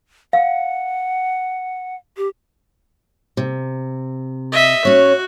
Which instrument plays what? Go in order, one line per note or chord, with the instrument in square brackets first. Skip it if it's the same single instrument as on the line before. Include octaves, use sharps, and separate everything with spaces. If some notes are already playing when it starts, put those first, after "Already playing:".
[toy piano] F5 [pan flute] F#5
[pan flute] G4
[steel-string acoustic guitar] C3
[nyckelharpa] D#5 E5
[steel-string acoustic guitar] C#4 C#5 [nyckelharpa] F#4